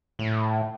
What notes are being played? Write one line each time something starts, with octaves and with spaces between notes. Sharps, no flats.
A2